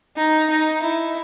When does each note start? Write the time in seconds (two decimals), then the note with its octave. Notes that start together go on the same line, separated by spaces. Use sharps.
0.17 D#4
0.50 D#4
0.83 E4